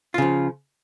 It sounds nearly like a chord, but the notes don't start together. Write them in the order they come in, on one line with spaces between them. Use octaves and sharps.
F4 C#3 F3